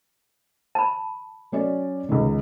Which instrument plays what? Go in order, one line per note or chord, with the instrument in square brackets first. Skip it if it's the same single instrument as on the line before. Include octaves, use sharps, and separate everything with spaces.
[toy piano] A5 B5
[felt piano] F#3 C#4 D5
C#2 D#3